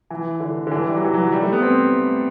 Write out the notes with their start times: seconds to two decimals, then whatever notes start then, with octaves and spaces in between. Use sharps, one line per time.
0.10 E3
0.40 D3
0.67 D3
0.71 E3
0.87 G3
0.96 F#3
1.05 E3
1.14 F#3
1.32 G3
1.43 A3
1.53 B3
1.62 C4